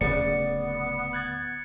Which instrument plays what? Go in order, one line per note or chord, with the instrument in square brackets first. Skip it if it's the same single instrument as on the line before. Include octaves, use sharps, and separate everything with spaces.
[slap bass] D1 C#3 [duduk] B3 [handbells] D5 [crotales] C#7
[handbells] F#6 G#6 A6